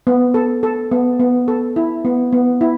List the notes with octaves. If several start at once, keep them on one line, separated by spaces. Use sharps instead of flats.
B3
A4
A4
B3
B3
A4
E4
B3
B3
E4